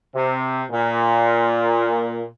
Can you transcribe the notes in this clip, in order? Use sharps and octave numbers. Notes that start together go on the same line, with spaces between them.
C3
A#2